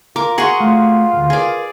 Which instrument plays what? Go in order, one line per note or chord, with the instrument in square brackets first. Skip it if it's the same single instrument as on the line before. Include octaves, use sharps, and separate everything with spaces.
[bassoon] F4 [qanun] A#4 [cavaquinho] D6
[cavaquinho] F#4 C6 C#6 [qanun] G#4 F#5
[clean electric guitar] A3 [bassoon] F4
[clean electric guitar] D2 G2
[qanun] G#4 D5 [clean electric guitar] A#4 B4